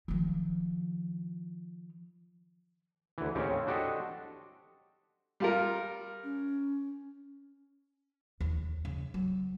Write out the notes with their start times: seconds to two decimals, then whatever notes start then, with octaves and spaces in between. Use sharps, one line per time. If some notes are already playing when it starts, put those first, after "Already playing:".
0.08 D#3 F3
3.18 D2 E3
3.35 D#2 A2 C#3 C4 C#4 G4
3.67 D4 F#4 G4 A4 C5 D#5
5.40 G3 F4 A#4
6.24 C#4
8.40 D#2
8.85 C#3
9.14 F#3